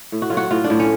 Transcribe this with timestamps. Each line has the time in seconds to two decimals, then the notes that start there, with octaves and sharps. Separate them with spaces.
0.12 A2
0.22 F#4
0.30 F#3 F4
0.37 F#4
0.50 A2 F4
0.64 D4
0.70 A2
0.80 C#4